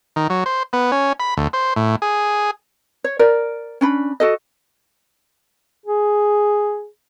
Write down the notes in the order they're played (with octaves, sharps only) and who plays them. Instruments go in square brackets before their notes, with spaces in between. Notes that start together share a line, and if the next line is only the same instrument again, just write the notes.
[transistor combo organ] D#3
F#3
C5
B3
C#4
B5
D2
C5
A2
G#4
[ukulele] C#5
A#4 D5
C#4 D4 B5
F#4 A4 D#5
[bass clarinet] G#4